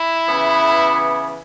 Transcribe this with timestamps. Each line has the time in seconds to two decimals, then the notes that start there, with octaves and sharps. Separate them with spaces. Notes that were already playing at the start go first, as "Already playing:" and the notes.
Already playing: E4
0.28 C#3 E3 B3